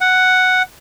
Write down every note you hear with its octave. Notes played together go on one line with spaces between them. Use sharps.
F#5